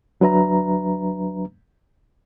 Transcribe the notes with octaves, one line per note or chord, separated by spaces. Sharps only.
D2 F#3 D4 B4 E5 A#5